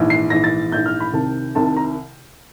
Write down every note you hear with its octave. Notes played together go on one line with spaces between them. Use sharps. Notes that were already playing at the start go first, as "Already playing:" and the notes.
Already playing: A#1 G#2 E3
C7
A#1 G#2 E3 A#6
A6
A#1 G#2 E3 G6
F6
B5
C2 C3 D#3 A5
C2 C3 D#3 A5
A5
A#5